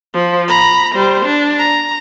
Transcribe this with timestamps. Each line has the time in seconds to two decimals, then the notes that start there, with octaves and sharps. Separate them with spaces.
0.14 F3
0.48 A#5 B5
0.95 G3 C5
1.25 D4
1.59 A#5